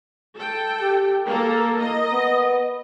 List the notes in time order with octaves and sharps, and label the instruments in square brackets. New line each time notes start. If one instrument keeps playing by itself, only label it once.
[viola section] A4 G5
[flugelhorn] G4
[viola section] A#3 A4 [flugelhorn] A#4
[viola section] D#5
[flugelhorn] B3